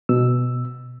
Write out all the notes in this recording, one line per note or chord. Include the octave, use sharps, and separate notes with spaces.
B2 E6